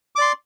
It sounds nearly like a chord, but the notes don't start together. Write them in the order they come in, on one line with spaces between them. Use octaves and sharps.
D6 D5 C6